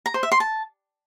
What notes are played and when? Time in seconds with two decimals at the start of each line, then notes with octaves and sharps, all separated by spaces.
0.06 A#5
0.14 C5
0.23 E5
0.32 C6
0.40 A5